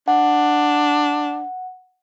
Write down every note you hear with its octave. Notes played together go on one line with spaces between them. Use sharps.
D4 F#5